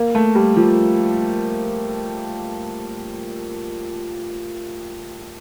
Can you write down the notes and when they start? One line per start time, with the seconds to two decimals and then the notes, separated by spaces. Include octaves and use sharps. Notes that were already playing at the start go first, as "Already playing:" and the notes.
Already playing: A#3
0.15 A3
0.35 G3
0.56 F3